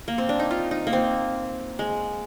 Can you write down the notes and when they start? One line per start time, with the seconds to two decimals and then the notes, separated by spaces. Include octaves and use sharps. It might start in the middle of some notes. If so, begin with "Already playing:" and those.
0.08 A#3
0.18 C4
0.29 D4
0.40 D#4
0.51 F4
0.71 D#4
0.87 A#3
0.93 C4
1.79 G#3